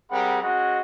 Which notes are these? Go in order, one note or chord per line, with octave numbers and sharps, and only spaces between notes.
G3 C4 G#4 A#4 F#5 B5
G#3 C#4 F#4 D#5 F#5